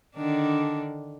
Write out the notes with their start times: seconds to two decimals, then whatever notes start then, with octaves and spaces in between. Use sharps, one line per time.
0.16 D3 D#3 D4